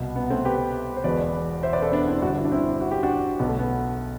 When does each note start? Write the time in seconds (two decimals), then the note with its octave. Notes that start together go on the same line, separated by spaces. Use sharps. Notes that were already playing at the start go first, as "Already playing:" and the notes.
Already playing: C2 B2
0.16 B3
0.30 A3 C4
0.45 G4 B4
0.96 C5
1.04 E1 E2 B2 B4 D5
1.63 C5 E5
1.73 B4 D5
1.82 A4 C5
1.92 B3 D4
2.07 C4 E4
2.22 G1 G2 D3 D4 F#4
2.37 E4
2.44 D4
2.52 C4 E4
2.81 F#4
2.91 G4
3.03 D4 F#4
3.39 B1 B2 B3
3.49 A3
3.59 B3